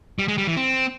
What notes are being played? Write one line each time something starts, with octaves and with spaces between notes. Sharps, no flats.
G3
G#3
G3
E3
C4